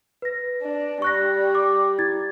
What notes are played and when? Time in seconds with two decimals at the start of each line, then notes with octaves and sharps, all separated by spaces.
0.22 B4 A#6
0.62 D4
1.02 G3 C#6 F#6 A#6
1.55 D6
1.99 E4 G#6 A6